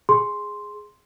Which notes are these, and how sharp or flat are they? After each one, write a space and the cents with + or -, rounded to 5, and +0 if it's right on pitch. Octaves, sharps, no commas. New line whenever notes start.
G#4 +0 C6 +0